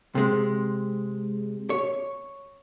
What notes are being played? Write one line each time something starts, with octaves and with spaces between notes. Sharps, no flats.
C3 G#3
C#5